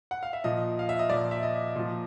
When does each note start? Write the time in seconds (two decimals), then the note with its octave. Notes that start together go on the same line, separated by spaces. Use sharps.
0.11 F#5
0.23 F5
0.33 E5
0.44 A#2 F3 D#5
0.79 F5
0.89 E5
0.99 D#5
1.09 A#2 F3 D5
1.31 E5
1.43 D#5
1.76 A#2 F3